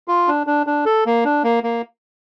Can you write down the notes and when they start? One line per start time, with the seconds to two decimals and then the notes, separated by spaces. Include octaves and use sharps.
0.08 F4
0.28 D4
0.47 D4
0.67 D4
0.86 A4
1.06 A#3
1.25 D4
1.44 A#3
1.63 A#3